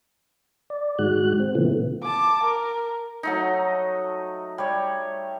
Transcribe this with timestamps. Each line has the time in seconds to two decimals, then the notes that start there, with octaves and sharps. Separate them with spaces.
0.70 D5
0.99 G#2 D#3 G#3 F#4 F#6
1.40 C4
1.55 A#2 C#3 E3 F3 A3 B3
2.03 A5 D6
2.44 A#4
3.23 F#3 A3 D#4
4.58 G3 C#5